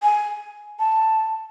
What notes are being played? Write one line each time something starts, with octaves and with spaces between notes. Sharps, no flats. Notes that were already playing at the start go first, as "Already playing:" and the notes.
G#5
A5